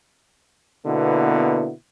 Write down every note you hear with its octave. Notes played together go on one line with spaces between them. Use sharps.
B2 D3 A#3 B3 E4